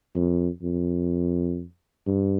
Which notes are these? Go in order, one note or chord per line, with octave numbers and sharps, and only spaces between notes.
F2
F2
G2